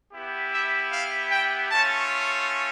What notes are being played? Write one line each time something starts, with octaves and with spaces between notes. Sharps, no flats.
B3 E4 G4
E5
F5
G5
A3 C#4 F4 A5